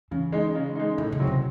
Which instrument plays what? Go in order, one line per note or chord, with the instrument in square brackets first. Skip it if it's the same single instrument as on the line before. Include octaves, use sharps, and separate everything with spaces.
[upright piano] C#3 [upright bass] E3
[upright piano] G#3 D#4
C#3
G#3 D#4
[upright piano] A2 [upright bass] D#3
[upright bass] C#3
[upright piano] F#3 C4
[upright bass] C3